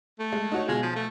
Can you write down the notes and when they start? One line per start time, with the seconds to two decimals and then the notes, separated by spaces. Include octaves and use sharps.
0.19 A3
0.32 G#3
0.52 D#4 F#4 C#5
0.68 B2 G#3 F4
0.82 F3
0.96 A3